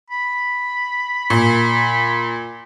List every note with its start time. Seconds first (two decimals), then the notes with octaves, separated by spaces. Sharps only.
0.10 B5
1.30 A#2